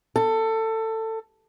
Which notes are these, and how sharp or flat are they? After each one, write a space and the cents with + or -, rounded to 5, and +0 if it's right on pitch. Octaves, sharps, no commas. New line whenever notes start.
A4 +20